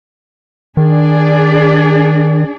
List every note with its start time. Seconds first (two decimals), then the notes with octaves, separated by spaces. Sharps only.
0.77 D#3 D4 G#4 D5